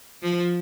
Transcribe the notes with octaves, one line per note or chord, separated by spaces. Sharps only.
F3